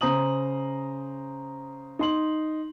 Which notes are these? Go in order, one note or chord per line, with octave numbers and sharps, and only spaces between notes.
C#3 C5 A#5 D#6 F#7
D#4 C6 F#7